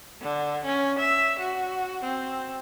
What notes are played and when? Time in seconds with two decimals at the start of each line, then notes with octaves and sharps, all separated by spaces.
0.22 D3
0.65 C#4
0.99 E5
1.40 F#4
2.04 C4